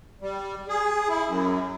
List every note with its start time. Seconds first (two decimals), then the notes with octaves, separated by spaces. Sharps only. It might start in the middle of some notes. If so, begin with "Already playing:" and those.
0.21 G3
0.68 G#4
1.09 E4
1.27 F#2